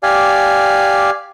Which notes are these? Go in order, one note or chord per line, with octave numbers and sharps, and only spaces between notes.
G4 D5 F5 G#5